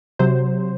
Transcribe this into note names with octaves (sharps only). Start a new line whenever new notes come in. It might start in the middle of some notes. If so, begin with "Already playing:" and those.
C3 F#3 C5